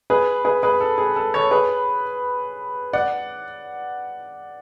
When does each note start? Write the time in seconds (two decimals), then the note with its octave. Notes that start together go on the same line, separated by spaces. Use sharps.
0.10 G#4 B4
0.45 G#4 B4
0.63 G#4 B4
0.81 A4
0.98 G#4
1.16 A4
1.34 A4 C#5
1.51 G#4 B4
2.93 D5 F#5